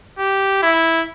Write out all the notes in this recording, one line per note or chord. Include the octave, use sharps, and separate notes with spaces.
G4
E4